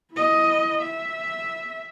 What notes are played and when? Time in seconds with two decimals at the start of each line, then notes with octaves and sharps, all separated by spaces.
0.13 E4 D#5
0.82 E5